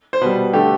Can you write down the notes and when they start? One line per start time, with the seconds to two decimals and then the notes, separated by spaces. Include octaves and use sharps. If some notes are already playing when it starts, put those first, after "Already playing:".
0.13 C5
0.21 B2 G3 B4
0.53 D3 A3 G4